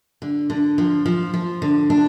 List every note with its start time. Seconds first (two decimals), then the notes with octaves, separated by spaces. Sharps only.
0.22 D3
0.50 D3
0.78 F3
1.06 F3
1.34 F3
1.62 D3
1.90 D4